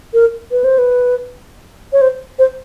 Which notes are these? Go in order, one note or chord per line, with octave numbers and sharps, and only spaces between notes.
A#4
B4
C5
B4
C#5
C5
C5